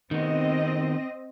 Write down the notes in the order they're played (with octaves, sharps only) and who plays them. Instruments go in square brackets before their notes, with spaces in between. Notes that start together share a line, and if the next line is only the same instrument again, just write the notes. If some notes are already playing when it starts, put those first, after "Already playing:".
[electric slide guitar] D#3 B3 [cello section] C4 D#5